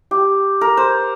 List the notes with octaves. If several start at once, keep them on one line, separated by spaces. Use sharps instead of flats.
G4
A#4
C5